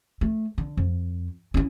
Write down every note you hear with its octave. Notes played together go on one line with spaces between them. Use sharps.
A3
D3
F2
C#4 E4